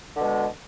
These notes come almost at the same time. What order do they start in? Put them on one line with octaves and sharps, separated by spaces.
D3 G#3 B2